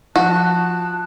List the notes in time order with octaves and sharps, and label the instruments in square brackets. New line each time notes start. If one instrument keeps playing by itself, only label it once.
[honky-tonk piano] F3 [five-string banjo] F#4 [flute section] A5 F#6